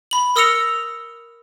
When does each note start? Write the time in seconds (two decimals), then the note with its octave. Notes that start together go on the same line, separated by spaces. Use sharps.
0.11 B5 F#7
0.36 A#4 D#6 E6 A#6 C#7 F7